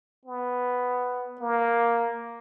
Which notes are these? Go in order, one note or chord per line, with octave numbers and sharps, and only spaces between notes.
B3
A#3